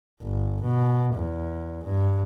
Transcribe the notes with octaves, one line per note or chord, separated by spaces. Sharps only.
G1
B2
E2
G2